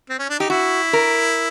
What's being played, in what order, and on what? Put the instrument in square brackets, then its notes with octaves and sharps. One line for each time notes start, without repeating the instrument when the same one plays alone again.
[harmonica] C4
C#4
D4
[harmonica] D#4 [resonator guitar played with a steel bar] G4
[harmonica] E4 [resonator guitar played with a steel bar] F#4
[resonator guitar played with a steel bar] A#4